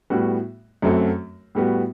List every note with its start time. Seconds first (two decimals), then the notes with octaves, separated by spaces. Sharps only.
0.10 A2 G3 B3 F#4
0.82 F#2 F#3 A3 C4 F#4
1.55 A2 G3 B3 F#4